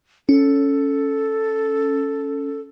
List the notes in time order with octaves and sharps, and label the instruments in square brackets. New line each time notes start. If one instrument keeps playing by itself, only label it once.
[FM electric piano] C#4 [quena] A4